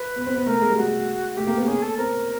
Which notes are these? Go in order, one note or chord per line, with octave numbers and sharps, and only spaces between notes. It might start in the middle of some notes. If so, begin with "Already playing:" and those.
Already playing: B4
B3
C4
B3
A3 A#4
G#3
G3
G#3 F#4
A3 G4
A#3
B3
G4
C#4 G#4
A4
C4 A#4